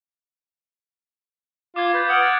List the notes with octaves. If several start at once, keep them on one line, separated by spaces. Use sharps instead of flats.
F4 D6 G#6
B4 G6 A6
F#5 D#6 F6 D7
F#6 G#6 A6